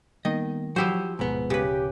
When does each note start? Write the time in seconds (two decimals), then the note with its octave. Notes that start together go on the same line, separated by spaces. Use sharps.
0.25 D#3 G3 A#3 B3 D#5
0.76 F3 F#3 E4 F#4 G4 C5
1.19 D1 G#2 B2 B3
1.50 C#3 G4 B4